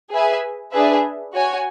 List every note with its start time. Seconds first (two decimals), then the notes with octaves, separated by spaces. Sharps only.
0.11 G#4 B4 E5 G#5
0.72 D4 G#4 B4 E5
1.34 F#4 C#5 G#5